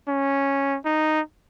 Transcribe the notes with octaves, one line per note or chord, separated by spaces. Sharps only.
C#4
D#4